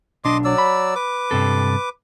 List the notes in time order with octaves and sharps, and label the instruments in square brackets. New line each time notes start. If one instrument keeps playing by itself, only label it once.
[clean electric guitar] B1 D4 [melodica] D#5 C6 D6
[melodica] F#3 D5 E6
[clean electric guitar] B5
[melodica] B4 D6
[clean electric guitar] G2 C3 A4